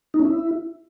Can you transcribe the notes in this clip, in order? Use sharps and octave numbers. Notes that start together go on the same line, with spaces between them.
D#4
C#4
E4